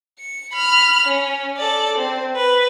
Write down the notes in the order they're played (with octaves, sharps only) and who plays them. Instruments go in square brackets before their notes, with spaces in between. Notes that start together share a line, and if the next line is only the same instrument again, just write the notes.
[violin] C#7
B5 F6
C#4
A4 D5
C4
B4